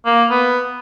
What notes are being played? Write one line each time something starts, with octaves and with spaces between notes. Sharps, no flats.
A#3
B3